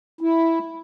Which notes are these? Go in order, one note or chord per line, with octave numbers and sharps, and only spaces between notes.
E4